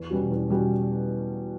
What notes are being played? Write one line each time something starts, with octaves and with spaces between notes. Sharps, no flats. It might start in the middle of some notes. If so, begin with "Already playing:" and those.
Already playing: E2
B2 G3 C#4 F#4
E2
B2 G3 C#4 F#4